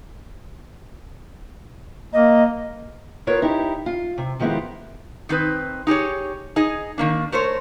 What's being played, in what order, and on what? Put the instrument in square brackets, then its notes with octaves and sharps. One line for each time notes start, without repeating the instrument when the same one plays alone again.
[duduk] A#3 [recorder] D#5
[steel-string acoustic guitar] B3 F4 A#4 B4 C#5
D#4 E4 G4
F4
C3
D#3 F3 G#3 B3 E4 G4
[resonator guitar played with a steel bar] D#3 C4 D#4 B4
D#4 G4 G#4 C#5
D#4 G#4 D#5
D#3 A#3 D4
A3 A#4 C5 C#5